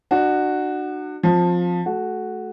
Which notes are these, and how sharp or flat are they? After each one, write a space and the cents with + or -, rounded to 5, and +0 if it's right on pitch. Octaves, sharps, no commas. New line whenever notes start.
D4 +40 F#4 +0
F3 +15 C4 +0
A3 -25 F#4 +0